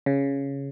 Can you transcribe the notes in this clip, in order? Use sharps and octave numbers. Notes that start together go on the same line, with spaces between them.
C#3